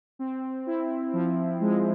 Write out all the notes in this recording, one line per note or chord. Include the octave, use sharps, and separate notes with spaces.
C4
E4
F3
G#3